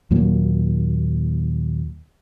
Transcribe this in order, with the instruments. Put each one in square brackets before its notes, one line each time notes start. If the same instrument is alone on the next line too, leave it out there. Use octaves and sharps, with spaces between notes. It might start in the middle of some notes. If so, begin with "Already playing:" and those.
[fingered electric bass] D#2 A#2 F#3 A#3